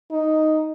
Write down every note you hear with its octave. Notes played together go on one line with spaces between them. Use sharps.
D#4